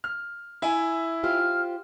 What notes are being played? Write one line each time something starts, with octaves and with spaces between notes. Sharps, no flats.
F6
E4 E5 G#5
F4 G4 C5 F6